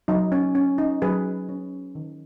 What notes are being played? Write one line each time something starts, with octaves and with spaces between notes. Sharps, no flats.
F#3 D#4
C#4
C#4
D#4
F#3 G#4 B4
C#4
D#3